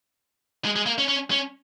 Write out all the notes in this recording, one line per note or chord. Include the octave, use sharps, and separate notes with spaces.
G#3
G#3
A#3
C#4
C#4
C#4